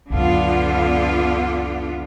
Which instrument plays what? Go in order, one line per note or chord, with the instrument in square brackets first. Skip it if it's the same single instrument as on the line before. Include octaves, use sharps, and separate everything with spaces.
[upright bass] C#2 F#2 [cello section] D3 B3 F4